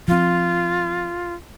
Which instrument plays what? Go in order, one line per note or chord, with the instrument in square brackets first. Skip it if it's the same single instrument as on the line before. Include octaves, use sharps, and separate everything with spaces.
[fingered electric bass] F3 C4 [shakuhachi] F4